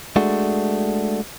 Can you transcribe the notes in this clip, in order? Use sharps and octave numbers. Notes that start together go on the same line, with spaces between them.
G#3 A3 D4 F#4